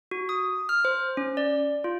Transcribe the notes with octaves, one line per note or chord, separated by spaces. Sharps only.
F#4
D#6
F6
C5
C#4
D5
F4